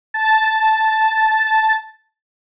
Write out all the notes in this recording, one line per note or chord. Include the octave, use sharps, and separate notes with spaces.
A5 A6